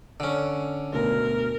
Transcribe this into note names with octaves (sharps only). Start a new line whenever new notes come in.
D3 C#4
D2 B2 A#4